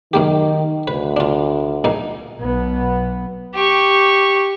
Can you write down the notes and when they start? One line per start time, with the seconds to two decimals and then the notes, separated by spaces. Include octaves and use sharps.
0.13 F#2 D#3 A#3 G4
0.88 D2 B4
1.17 D4 F4
1.84 A#1 A#3 D#4
2.42 B1 B3
3.55 G4 C#6